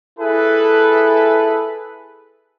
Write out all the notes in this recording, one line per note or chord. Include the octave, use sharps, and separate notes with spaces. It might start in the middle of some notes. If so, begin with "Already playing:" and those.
E4 G#4 A4 B4